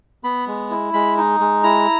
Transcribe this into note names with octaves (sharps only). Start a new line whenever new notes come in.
B3 B5
G#3
E4
G#3 B5
D#4
G#3
E4 A#5